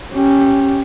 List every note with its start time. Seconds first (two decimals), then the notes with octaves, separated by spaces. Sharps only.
0.13 C#4 G4